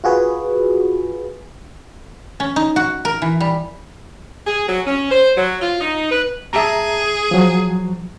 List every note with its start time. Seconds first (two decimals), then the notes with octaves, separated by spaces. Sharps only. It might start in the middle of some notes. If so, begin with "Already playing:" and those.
0.04 F4 F#4 G#4 B4
2.40 C#4
2.56 D#4
2.76 F#4
3.05 A#4
3.22 E3
3.40 G3
4.47 G#4
4.68 F#3
4.86 C#4
5.11 C5
5.36 F#3
5.61 F4
5.80 D#4
6.11 B4
6.53 G#4 E5 A5 A#5
7.31 F3 F#3